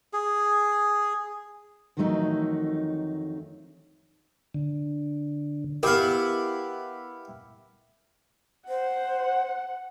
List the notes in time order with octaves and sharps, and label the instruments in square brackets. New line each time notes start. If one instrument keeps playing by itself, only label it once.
[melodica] G#4
[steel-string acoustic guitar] F2 D#3 E3 F#3 A3 D#4
[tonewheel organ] D3
[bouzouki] B3 E4 [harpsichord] G4 F5 [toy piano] A#4
[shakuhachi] C5 [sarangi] F#5